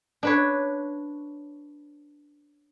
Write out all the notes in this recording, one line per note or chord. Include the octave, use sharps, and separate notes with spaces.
D4 B4 C#5